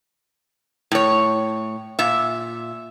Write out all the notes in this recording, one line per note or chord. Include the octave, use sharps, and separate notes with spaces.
A2 C#5
A#2 E5